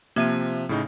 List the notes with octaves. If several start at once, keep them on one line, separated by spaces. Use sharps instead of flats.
C3 F3 A#3 E5 D#7
A2 C#3 D#4